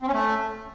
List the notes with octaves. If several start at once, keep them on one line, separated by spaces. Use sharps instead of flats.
C4
C#4
A3